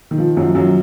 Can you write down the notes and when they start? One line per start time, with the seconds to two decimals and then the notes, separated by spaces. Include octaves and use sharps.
0.11 D#3
0.18 F3
0.37 F#2 F#3
0.55 F#2 F#3